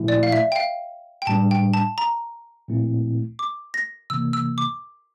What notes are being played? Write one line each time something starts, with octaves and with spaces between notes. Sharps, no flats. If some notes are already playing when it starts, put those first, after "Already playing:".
Already playing: A#2 F3 A3 E4
D5
F5
E5
G5
F5
G5
A2 G3 D4 A5
G5
A5
A#5
A#2 F3 A3 C4 E4
D6
A#6
C3 E3 A#3 E6
E6
D6